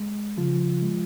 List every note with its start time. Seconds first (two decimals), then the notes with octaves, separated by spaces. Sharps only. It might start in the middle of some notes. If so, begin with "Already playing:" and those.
Already playing: G#3
0.37 C#3 F3 F4
0.82 G#3